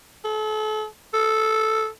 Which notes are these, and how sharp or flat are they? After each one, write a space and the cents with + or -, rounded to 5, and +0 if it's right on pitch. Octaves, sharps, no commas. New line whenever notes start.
A4 -35
A4 -5